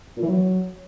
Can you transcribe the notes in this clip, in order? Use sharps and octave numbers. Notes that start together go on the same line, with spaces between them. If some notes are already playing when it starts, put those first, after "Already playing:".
A#2
E3
F#3